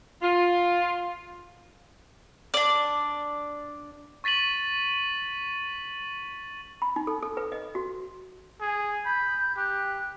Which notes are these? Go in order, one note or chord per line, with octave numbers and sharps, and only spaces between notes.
F4
D4 D5
C#6 A6 B6 D#7 F#7
B5
D#4
A4
A4
B4
D#5
F#4
G#4
B5 G6
G4 F#6